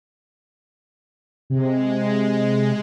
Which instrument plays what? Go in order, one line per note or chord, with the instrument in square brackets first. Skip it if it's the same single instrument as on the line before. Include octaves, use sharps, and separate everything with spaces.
[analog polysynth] C3 [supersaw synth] G#3